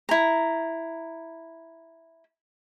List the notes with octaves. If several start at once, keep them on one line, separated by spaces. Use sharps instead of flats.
E4 A#5